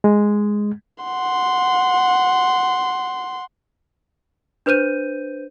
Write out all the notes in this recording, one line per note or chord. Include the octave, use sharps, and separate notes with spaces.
G#3
F#5 C6
D4 B4 C5 G6 D#7